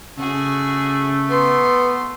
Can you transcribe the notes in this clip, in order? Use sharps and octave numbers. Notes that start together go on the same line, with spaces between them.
C#3 A3 F#4 G#4
B3 C6